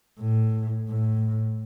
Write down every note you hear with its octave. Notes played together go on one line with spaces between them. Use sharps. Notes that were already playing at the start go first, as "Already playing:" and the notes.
A2
A2